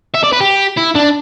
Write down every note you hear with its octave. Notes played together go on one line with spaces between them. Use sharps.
E5
D5
B4
G4
E4
D4